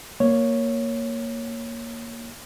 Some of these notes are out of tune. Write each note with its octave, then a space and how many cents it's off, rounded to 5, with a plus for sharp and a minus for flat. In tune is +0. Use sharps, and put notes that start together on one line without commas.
A#3 +0 C#5 +0